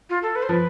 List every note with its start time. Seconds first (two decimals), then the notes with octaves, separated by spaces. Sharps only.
0.10 F4
0.23 A4
0.36 B4
0.43 C5
0.49 F3 B4